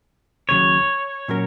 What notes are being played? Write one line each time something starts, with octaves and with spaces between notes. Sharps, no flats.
D#2 C#3 F#3 C#5
A#2 F#3 C#4 F#4 A#4